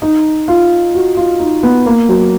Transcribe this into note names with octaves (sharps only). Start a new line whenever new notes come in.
D#4
F4
F#4
F4
D#4
B3
A#3
F#3